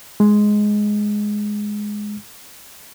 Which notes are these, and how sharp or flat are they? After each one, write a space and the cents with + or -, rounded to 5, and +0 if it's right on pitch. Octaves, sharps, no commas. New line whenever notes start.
G#3 +5